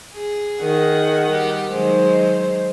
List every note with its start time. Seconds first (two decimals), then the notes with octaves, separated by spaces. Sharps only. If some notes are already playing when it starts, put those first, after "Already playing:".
0.13 G#4
0.62 D#3 F#5
1.28 G3 G4
1.72 D#3 F#3 G#3 C5